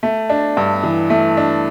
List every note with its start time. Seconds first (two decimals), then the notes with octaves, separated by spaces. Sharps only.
0.03 A3
0.29 D4
0.57 G2
0.83 E3
1.10 A3
1.37 D4